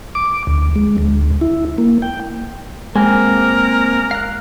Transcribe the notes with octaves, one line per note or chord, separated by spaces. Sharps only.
D6
D2
G#3
D2
E4
A#3
G5
G#3 A#3 C4 A#4
F5 F#6